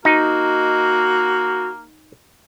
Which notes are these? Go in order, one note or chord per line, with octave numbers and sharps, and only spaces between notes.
A#3 D#4 F#4